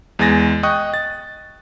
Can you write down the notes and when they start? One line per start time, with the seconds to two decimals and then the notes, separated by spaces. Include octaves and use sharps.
0.19 E2 G#3 G#5 A6 A#6
0.63 D#5 G5 C#6 D#6 F#6
0.94 A6